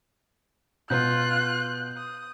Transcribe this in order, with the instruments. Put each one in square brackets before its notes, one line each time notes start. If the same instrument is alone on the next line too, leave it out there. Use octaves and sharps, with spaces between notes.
[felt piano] B2 B3 [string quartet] F4 [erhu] F#6 [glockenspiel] G6
[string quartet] D#6